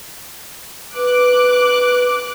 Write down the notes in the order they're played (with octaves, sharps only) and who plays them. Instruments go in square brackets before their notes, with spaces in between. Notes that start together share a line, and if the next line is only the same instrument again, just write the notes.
[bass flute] B4 [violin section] D6 F#6